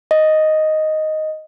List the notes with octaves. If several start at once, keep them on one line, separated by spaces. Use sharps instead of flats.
D#5